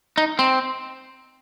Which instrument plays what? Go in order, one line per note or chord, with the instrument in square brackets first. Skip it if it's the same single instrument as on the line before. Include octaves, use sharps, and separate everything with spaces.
[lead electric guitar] D#4
C4